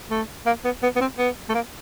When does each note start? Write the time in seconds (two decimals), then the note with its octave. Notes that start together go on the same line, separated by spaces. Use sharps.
0.11 A3
0.46 A#3
0.65 B3
0.83 B3
0.96 B3
1.01 C4
1.18 B3
1.49 A3
1.54 A#3